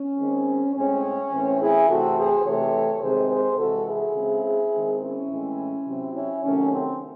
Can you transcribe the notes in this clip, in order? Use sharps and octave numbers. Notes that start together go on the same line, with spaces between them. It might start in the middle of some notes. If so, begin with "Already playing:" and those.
Already playing: C#4
D#3 G#3 C4
A2 G#3 C4 C#4
A2 E3 C4
E4 G#4
C3 E3 A3 C4 F#4 A4
G#4 C5
C3 E3 A3 C4 A4 C#5
C3 D#3 G#3 C4 G#4 C5
G#4 C5
C3 E3 G#3 F#4 A4
E4 G#4
C#3 G#3 C4
D#3 G#3 C4
C#4 E4
A2 E3 G#3 C4
C3 F#3 C4
C#4 E4
C3 D#3 F#3 A3 C#4
C4